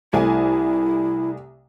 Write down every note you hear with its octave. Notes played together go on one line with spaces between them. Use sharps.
C2 A3 E4 G#5